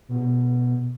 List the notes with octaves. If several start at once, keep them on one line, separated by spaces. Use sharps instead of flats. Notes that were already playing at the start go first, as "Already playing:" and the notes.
B2